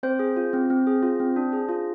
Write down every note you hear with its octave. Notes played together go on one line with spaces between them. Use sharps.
C4 C5
G#4
F4
C4
C4
G#4
F4
C4
D4
G#4
F4